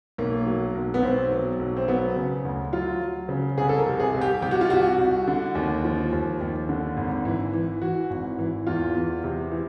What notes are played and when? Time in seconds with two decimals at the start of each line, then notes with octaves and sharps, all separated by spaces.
0.18 B1 A#3
0.46 F#3
0.75 B1
0.94 B3
1.02 B1 C4
1.31 F#3
1.59 B1
1.77 C4
1.87 F#3 B3
2.15 C#3
2.45 D2
2.73 F#3 F4
3.01 F#3
3.29 C#3
3.58 C2 G#4
3.69 A4
3.78 A#4
3.86 C3
4.00 G#4
4.14 C2
4.22 G4
4.42 C3 G4
4.51 F#4
4.61 F4
4.70 C2 F#4
4.99 C2
5.27 D3
5.55 D#2
5.84 F3
6.13 D#2
6.41 D#2
6.69 D3
6.97 G#1
7.25 E3
7.53 E3
7.82 E3 F#4
8.10 G#1
8.39 E3
8.67 E2 F4
8.95 E2
9.24 C3
9.52 E3